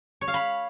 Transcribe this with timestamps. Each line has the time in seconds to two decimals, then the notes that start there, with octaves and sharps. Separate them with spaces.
0.21 C#5
0.28 F5
0.34 B5